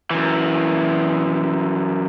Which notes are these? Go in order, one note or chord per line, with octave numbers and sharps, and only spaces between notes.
F#2 E3